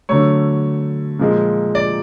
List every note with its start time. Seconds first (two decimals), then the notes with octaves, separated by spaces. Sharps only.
0.09 D3 F#3 A3 C#5
1.19 A#2 F3 G#3
1.75 D5